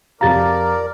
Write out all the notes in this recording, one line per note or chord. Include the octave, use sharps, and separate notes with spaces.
F2 G4 A#4 D5 F5 A#5 A6